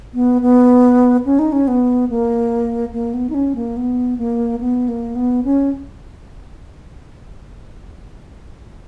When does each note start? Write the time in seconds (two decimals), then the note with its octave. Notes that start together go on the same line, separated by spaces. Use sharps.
0.14 B3
0.42 B3
1.26 C#4
1.39 D#4
1.52 C#4
1.68 B3
2.10 A#3
2.93 A#3
3.14 B3
3.30 D#4
3.34 C#4
3.55 A#3
3.77 B3
4.18 A#3
4.61 B3
4.88 A#3
5.15 B3
5.45 C#4